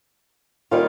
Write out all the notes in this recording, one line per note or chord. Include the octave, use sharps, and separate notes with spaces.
D#3 G3 A#3 C#4 F4